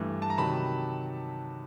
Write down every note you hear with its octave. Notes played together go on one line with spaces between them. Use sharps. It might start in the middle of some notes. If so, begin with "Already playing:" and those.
Already playing: G2 E3 A3
A5
A#5
C3 D#3 F#3 A5 B5